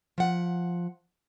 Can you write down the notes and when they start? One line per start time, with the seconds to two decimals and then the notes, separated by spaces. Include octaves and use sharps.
0.18 F3 F#5